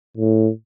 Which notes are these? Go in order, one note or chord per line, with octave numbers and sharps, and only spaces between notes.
A2